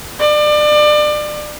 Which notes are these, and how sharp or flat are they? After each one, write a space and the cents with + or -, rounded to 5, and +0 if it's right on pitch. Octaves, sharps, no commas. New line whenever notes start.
D5 +30